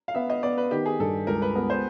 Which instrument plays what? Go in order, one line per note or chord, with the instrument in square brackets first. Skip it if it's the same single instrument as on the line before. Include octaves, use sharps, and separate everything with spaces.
[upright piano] F5
[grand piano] B3 [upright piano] E5
[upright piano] D#5
[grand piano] B3 [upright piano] D5
[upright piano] B4
[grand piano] D#3 [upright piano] G4
[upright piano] G#4
[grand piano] G2 [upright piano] A4
[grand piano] C#2 [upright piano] A#4
[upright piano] B4
[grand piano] B3 [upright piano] A#4
[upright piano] C5